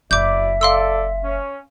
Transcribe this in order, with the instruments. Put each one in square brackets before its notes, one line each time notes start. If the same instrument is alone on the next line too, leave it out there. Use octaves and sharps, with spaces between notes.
[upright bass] F#1 [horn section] B2 E4 D5 [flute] E5 [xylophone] D6 G6
[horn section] A4 D5 [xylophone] F5 C6 E6
[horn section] C#4